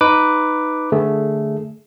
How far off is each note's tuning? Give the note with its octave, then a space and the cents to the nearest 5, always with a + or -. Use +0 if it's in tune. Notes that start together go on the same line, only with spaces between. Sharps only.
D#4 +0 B4 +5 D6 +0
D3 +5 A3 +0 G#4 +0